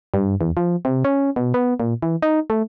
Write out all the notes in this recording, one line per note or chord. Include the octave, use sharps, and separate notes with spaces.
G2
E2
F3
C3
C#4
B2
B3
A#2
E3
D#4
A3